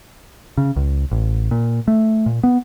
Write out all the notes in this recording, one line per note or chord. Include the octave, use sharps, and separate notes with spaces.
C#3
C#2
A1
A#2
A3
A#2
B3